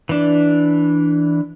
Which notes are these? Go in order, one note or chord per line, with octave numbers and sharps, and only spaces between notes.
E3 D4